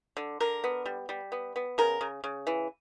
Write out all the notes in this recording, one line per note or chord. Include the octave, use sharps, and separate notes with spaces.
D3
D3 A#4
B3
G3
G3
B3
B3
C#3 A#4
C#3
C#3
E3